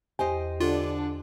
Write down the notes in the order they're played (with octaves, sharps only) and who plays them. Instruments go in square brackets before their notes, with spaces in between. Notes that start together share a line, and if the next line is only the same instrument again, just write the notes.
[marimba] E2 [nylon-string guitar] G4 C5 D#5
[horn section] D3 D4 [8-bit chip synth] F4